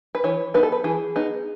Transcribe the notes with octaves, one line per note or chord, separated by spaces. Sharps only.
B4
E3 C#5
B3 D#4 B4
A4
B4
E3 G#4
B3 D#4